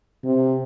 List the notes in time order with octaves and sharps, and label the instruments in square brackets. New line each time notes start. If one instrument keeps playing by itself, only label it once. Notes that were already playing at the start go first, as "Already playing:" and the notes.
[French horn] C3